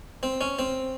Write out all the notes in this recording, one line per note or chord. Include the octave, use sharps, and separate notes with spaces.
C4
C#4
C4